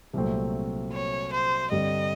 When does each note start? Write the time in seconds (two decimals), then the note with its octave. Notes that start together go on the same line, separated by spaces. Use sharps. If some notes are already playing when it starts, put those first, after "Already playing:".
0.13 C2 A#2 F#3 A3 C4
0.93 C#5
1.33 C5
1.71 G2 D3 G3 C4 D#5